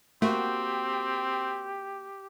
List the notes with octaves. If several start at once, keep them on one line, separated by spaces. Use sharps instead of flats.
A3 A#3 C4 F#4 G4